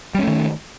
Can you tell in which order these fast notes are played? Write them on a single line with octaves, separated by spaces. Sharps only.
G3 C#4 A3 D#3